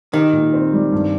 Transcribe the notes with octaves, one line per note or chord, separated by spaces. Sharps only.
D#3 G4
A#2
C4
G3
G2